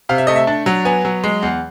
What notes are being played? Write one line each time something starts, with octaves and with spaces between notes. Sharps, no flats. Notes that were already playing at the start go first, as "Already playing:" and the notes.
C3 F5
E5
A3 D#5
E5
D4 A5
F#3
B3 G#5
F#3
G#3
E2